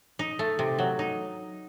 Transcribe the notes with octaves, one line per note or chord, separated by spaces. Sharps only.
D#4
A3
C3
F#3
D#4